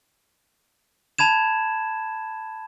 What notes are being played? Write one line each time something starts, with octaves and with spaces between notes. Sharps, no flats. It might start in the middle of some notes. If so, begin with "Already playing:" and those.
A5 B5 G#6 E7